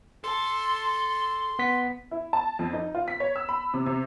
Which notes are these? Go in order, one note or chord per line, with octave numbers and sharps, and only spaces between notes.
A4 A5 C6
B3 B6
E4
A5
F2
D#4
F4
B6
C#5
E6
B5
C3
C3